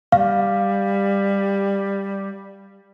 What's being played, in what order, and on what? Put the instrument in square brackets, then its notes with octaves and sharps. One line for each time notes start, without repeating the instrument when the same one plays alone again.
[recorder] G3 [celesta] F5